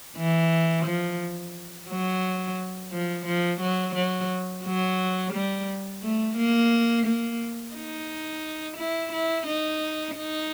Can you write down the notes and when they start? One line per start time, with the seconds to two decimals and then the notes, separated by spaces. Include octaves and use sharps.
0.17 E3
0.86 F3
1.89 F#3
2.92 F3
3.26 F3
3.61 F#3
3.95 F#3
4.65 F#3
5.33 G3
6.03 A3
6.37 A#3
7.06 A#3
7.74 D#4
8.77 E4
9.12 E4
9.47 D#4
10.16 D#4